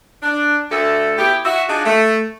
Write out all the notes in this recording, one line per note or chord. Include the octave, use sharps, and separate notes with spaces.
D4
D2 D3 A3 A4
B3 E4 G4
F#4 E5
D4 D#4 F4 F#4 G#4
A3